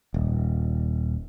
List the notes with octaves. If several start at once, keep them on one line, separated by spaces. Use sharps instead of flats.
D#1